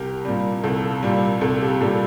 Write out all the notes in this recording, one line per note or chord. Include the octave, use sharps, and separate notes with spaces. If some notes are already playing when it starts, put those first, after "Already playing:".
Already playing: C2 G4 A#4
A#2 G3
C2 A4
A#2 G3 G4
C2 A4
G4
A#2 G3 A4